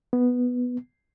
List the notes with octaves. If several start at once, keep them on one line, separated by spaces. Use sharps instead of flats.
B3